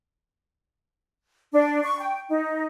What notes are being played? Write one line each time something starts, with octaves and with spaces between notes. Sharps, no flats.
D4
C#6
G5
D#4